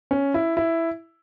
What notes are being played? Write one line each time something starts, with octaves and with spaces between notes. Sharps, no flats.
C#4
E4
E4